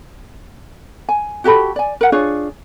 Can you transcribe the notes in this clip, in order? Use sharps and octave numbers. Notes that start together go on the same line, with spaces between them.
G#5
F#4 G4 A4 B5
D5 G#5
A#4 F#5
D4 F4 G#4 C#5